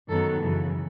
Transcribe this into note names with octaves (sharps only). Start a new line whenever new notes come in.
F#2 D#3 F#3 B3 A4
F#2 C#3 E3